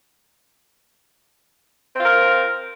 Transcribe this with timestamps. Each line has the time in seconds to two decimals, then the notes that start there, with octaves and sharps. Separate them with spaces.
1.96 C4
1.99 F4
2.03 A#4